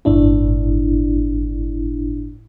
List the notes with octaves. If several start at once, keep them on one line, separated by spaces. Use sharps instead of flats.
G1 A2 D4 E4